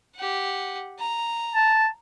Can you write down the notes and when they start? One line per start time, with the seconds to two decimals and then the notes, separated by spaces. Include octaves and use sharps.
0.16 G4 F#5
0.99 A#5
1.55 A5